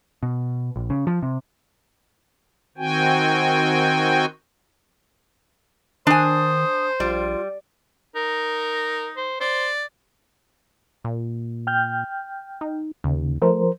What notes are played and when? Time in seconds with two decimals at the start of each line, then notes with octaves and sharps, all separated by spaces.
0.23 B2
0.76 A#1
0.90 C#3
1.07 F3
1.23 C3
2.78 D#3 C4 F#4 G5 G#5
6.07 D#3 D4 C5 G#5 D#6
7.00 A#1 G3 F4
8.16 D#4 A#4
9.17 C5
9.41 C5 D5
11.04 A#2
11.67 G5 F6 G6
12.61 D#4
13.04 D#2 C#3
13.42 F3 A3 A#4 C5